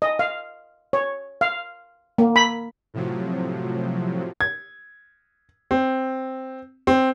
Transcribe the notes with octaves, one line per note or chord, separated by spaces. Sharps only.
D#5
F5
C#5
F5
A#3
B5
A2 C3 F3 F#3
G#6
C4
C4